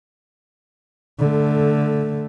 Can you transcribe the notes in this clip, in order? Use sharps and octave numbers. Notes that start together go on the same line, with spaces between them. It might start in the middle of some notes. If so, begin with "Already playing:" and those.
D3 A3